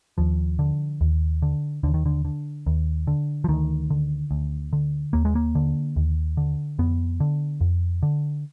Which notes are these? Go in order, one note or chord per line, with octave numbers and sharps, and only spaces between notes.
D#2 F3
D3
D#2
D3
D#2 D3
D#3
D3
D3
D#2
D3
F3
D2 D#3
D3
D2
D3
D#2 A#3
G#3
A#3
D3
D#2
D3
F2 B3
D3
F2
D3